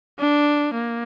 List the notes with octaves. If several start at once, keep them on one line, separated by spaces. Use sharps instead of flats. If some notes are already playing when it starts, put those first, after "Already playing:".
D4
A#3